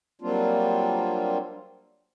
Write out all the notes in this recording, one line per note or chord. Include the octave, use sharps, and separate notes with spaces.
F#3 G3 A#3 C4 D4 F4